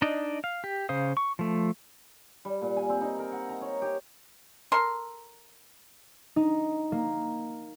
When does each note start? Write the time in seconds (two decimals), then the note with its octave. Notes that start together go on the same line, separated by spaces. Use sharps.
0.02 D4 D#4 D5 D#5
0.44 F5
0.64 G4
0.89 C#3 C5 F5 D#6
1.17 C#6
1.39 F3 A3
2.45 G3
2.62 A#2
2.77 G#5
2.89 C4
3.01 D#4
3.19 A#4
3.32 F#5
3.49 A#5
3.61 C#5
3.82 G4
4.72 A4 A#4 C6
6.36 D#4
6.92 A#3